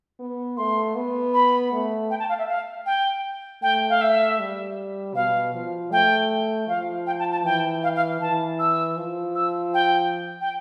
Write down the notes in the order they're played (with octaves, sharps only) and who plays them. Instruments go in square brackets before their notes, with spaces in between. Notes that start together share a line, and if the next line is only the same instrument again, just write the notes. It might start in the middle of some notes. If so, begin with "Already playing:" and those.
[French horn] B3
[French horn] A3 [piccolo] C6
[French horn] B3
[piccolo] B5
[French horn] A3
[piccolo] G5
A5
F5
E5
F5
G5
[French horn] A3 [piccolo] G5
[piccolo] F5
E5
[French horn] G3
[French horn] B2 [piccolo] F5
[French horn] F3
[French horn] A3 [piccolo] G5
[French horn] F3 [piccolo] F5
[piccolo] G5
A5
A5
[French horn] E3 [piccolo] G5
[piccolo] F5
F5
[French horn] E3 [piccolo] A5
[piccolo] E6
[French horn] F3
[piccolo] E6
G5
G5